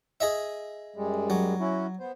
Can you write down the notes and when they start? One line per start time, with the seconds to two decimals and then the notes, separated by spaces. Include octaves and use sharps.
0.20 G#4 D#5 E5
0.96 F#2 G3 G#3
1.30 F#3
1.60 C#4 E4 F#4
2.00 B3 C5